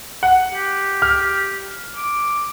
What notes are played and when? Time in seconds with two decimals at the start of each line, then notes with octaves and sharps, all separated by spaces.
0.23 F#5
0.51 G4
1.02 F6
1.96 D6